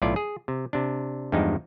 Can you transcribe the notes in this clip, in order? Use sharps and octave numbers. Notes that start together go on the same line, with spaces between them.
B1 A2 E4 F4 D5
G#4
C3
C3 D4
E2 G2 F3 G#3 D#4